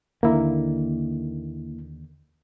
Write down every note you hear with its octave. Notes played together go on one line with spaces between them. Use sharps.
D#2 D3 D#3 A#3 E4